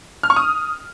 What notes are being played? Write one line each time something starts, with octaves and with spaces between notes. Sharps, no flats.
F6
C#6
D#6